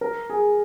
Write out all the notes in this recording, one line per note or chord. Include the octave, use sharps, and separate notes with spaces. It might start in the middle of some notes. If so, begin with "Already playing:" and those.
A#4
G#4